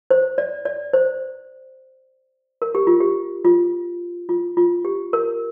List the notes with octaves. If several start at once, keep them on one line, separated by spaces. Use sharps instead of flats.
C5
D5
D5
C5
A#4
G4
F4
G4
F4
F4
F4
G4
A#4